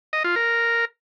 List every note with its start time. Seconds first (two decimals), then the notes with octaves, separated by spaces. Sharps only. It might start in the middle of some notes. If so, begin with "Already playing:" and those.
0.13 D#5
0.24 F4
0.36 A#4